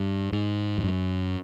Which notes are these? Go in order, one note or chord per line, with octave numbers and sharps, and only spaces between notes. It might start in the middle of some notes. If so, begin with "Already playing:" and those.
Already playing: G2
G#2
F2
F#2